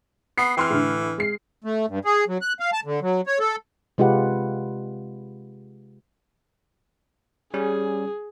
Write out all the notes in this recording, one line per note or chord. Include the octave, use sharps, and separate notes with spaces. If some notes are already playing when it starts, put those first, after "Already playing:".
B3 C7
E3 G5 C6 F6
A2 D3
G#3 C7
A3
G2
G#4
F#3
F#6
F5
A5
D3
F#3
C#5
A4
C3 G#3 F4 G4 B4 F#5
G3 C#4 G#4